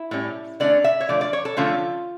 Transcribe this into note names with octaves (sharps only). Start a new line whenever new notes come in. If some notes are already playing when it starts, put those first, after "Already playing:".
Already playing: E4
A2 G3 C#4
D3 A3 C#4 D5
E5
C#5
D3 F3 A3 D5
D5
C#5
A4
D3 F3 A3 C#4 F4